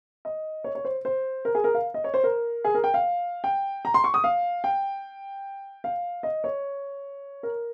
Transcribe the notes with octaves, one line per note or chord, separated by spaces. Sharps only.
D#5
C#5
C#5
C5
C5
A#4
G#4
A#4
F5
D#5
C#5
C5
A#4
G#4
A#4
G5
F5
G5
A#5
C6
C#6
D#6
F5
G5
F5
D#5
C#5
A#4